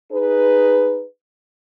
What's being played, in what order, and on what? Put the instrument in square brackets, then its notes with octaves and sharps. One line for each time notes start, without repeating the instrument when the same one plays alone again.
[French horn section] D#4 G#4 B4